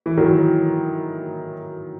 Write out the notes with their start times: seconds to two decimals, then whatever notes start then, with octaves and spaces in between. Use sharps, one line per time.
0.06 E3
0.17 D#3 F#3